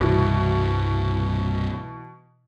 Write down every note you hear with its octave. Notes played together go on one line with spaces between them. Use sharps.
C2 G2 B2 E3